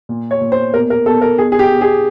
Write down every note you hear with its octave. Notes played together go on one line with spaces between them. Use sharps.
A#2
C#5
A#2
C5
B2 A#4
A#4
B2 A4
A#4
B2 G#4
G#4
G4
B2
G#4